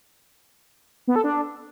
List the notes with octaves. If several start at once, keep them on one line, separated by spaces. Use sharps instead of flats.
B3
A4
D4